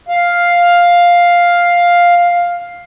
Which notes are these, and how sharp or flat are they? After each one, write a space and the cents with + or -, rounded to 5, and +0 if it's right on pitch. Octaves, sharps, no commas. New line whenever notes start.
F5 +5